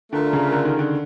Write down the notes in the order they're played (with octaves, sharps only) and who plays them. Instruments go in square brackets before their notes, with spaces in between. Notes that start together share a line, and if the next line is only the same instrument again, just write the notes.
[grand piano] D3 [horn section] A3 D4 F4 A#4
[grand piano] C#3
D3
D#3
D3